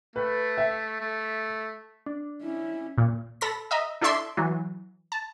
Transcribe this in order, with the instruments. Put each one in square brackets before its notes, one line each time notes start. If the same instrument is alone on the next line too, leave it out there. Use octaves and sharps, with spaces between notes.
[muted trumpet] A3 [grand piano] B4
[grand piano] E5
[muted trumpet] A3
[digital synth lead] D4
[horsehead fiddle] C#4 E4
[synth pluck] A#2
A4 B5 A#6
D#5 E5 A#5
D4 E4 A4 D5 E5 C6
E3 F#3
A5